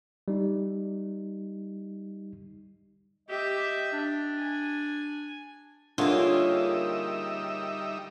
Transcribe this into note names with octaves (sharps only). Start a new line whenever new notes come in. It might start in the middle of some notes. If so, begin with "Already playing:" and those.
G3 D#4
G4 D#5 E5
D4
G#5
D3 G3 A#3 D#4 F4 G#4 C#5 E5